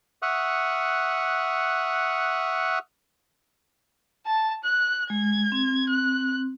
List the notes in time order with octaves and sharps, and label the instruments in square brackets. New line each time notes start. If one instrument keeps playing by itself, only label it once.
[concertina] E5 F#5 C#6 D#6 F6 F#6
[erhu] A5
F#6
[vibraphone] G#3 [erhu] G#6
[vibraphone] C4
[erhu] F#6